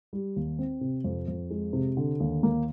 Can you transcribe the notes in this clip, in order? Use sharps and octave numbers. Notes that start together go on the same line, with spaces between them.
G3
D#2
C4
C3
F2
F2
G#3
C3
D3
D#2
A#3